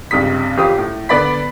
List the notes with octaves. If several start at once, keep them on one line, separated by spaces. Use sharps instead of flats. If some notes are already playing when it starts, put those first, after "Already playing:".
C#2 G2 C3 D#6 B6
A1 F4 G4 C5 D#6
A2
D3 B3 D5 B5 B6